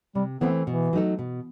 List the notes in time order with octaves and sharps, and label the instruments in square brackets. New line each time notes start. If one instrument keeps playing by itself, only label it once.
[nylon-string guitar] C3 [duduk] G3
[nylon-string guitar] E3 A3 C4 E4 [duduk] B3
[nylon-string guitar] B2 [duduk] E3
[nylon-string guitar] F#3 A3 D#4 A4
B2